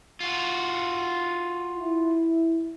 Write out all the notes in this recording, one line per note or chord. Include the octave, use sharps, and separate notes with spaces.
F4 F#4
E4